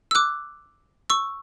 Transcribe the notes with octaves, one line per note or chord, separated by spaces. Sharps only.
E6
D6 F#6
C#6 E6